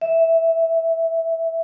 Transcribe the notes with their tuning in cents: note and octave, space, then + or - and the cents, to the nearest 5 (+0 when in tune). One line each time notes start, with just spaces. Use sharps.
E5 -5